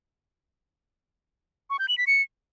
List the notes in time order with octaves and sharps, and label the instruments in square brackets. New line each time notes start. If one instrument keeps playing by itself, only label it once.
[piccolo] C#6
G6
F#7
B6
C#7